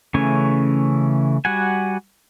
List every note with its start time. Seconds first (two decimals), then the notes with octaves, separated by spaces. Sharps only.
0.14 C#3 E3 A3 C#4 G#5
1.45 G3 F#4 F#5 G#5